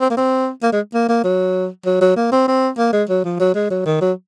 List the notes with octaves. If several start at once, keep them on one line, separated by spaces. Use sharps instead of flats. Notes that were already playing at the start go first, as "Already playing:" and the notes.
C4
A#3
C4
A#3
G#3
A#3
A#3
F#3
F#3
F#3
A#3
C4
C4
A#3
G#3
F#3
F3
F#3
G#3
F#3
D#3
F#3